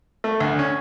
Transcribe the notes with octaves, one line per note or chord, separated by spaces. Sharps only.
A3
D2
C#4